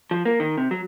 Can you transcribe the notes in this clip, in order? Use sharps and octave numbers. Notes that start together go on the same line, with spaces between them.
F3
A#3
D#3
C3
F#3